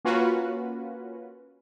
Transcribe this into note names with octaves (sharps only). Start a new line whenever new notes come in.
A#3 C#4 F4 F#4 B4